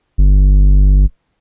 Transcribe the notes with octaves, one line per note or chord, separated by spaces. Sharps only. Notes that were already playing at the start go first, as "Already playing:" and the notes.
G1